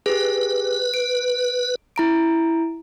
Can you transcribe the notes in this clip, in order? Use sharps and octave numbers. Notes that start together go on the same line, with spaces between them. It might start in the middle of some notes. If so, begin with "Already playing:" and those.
G4 G#4 B4
D7
E4 A#5 D7